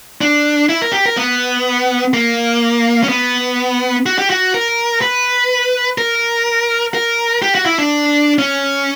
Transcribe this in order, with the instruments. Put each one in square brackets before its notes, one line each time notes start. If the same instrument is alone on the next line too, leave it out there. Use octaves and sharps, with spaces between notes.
[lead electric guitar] D4
E4
A#4
G4
A#4
B3
A#3
C#4
B3
F#4
G4
F#4
A#4
B4
A#4
A#4
G4
F#4
E4
D4
C#4